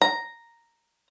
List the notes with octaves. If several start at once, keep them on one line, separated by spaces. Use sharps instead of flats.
A#5